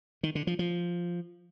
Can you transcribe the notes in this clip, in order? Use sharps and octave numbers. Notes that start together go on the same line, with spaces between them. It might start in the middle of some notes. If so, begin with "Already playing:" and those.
D#3
D3
F3
F3